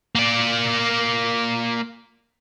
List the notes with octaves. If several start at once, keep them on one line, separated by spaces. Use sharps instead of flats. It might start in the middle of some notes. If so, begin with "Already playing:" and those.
A#3 D5